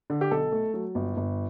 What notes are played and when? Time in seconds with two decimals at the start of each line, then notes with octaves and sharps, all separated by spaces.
0.10 D3
0.21 G4
0.31 B1 A4
0.52 A3
0.74 F#3
0.95 G1
1.17 G1